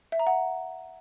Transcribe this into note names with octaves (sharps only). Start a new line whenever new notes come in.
E5
A#5
F#5